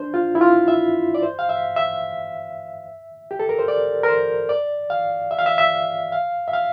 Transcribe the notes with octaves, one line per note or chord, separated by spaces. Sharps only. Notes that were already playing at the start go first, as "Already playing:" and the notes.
Already playing: D4 C5
F4
E4
F4
E5
D5
C5
F5
E5
E5
G4
A4
A#4
C5
D5
A#4
C5
D5
F5
E5
F5
E5
E5
F5
E5
F5